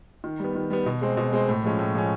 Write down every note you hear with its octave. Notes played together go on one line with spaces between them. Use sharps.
D#3
G3 B3
D#3
G3 B3
B2
G#3 C4
B2
G#3 C4
A2
F3 G#3 C#4
A2
F3 G#3 C#4